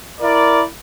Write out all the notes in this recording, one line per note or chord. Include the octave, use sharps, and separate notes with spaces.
E4 A#4 D5